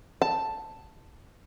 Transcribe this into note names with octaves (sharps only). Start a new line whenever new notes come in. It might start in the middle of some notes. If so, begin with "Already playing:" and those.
A5